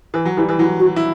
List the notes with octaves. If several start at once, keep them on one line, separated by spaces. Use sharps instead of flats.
E3
F#3
E3 G3 E4
E3
F#3 E4
F#4
E4